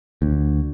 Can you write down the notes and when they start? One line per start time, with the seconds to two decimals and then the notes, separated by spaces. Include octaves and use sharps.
0.22 D2